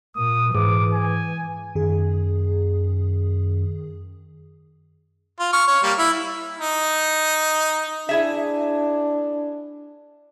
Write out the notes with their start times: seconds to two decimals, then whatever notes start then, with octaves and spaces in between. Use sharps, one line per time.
0.16 A#2 D#6
0.55 G#2 E3 D6
0.93 G#5
1.75 F#2 D#3 G#4
5.40 F4
5.53 C#6 F6
5.67 C#5
5.83 G3 A#3
5.99 E4
6.59 D#4
8.09 D4 E4 G#4 E5